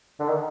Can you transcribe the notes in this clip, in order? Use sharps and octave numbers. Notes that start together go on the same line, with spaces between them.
D3
D#3